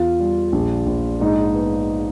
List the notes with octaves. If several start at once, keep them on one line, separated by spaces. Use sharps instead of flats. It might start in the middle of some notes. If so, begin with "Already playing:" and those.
Already playing: E2 F4
G3
A#1
A#1
G#2 D#4
B3